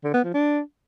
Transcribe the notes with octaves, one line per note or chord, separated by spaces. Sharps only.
D3
B3
F3
D4